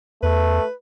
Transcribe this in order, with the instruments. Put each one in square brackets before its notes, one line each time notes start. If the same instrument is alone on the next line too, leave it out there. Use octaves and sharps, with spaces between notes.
[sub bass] E2 [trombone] A3 [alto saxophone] B4